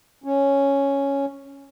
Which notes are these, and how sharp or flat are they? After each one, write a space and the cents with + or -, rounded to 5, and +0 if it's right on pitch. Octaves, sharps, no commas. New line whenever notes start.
C#4 +0